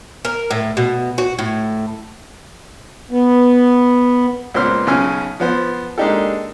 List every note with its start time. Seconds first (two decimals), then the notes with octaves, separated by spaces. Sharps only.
0.25 A#4
0.51 A2
0.77 B2
1.18 F#4
1.39 A2
3.11 B3
4.54 C#2 A#2 B3 C5 C6 F6
4.87 B1 C#3 C#4 G#5 F6
5.40 F3 B3 C5
5.98 G#3 A#3 D4 D#4 G4 A4